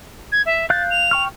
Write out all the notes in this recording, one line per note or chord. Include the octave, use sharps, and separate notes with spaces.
G#6
E5
F5 F#6 G6 A6
F7
G5 C#6 F6